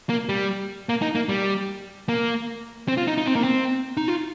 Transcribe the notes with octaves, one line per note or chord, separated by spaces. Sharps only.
A#3
G3
A#3
D#4
A#3
G3
A#3
C4
F4
D#4
D#4
C4
A#3
C4
D#4
F4